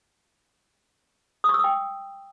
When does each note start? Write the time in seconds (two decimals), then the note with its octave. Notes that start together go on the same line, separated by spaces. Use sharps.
1.44 D#6
1.49 C#6
1.54 E6
1.59 D#6
1.64 G5